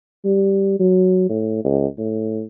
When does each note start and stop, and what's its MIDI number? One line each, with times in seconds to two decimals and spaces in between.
0.25 0.80 55
0.80 1.29 54
1.29 1.64 45
1.64 1.87 37
1.98 2.44 45